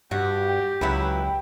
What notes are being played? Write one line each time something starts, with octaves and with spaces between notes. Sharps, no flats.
G2 F#4 G4
G5
C#2 F#3 E4 B4